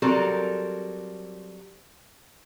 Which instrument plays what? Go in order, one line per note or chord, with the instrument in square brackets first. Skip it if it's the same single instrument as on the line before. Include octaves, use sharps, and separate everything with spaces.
[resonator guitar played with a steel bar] F#3 G3 C4 A4 A#4